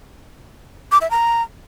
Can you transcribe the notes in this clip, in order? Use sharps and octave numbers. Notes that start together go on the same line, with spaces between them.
D6
E5
A#5